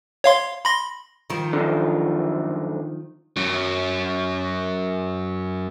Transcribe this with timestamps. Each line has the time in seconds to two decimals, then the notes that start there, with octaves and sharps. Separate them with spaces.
0.24 C#5 F5 C6
0.65 B5 C6 A#6
1.30 D#3 F3
1.53 F#2 D3
3.36 F#2 F#3